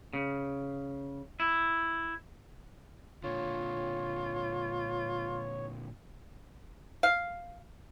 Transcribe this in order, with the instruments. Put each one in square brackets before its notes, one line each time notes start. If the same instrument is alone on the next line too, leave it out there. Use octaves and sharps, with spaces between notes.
[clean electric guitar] C#3
E4
[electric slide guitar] A#2 D3 [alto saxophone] F4 [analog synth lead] C#5
[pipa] F5